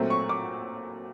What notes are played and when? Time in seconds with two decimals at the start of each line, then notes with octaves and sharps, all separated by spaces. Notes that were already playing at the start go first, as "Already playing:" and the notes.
Already playing: A#2 F#3 A3 C4
0.10 C#6
0.29 D6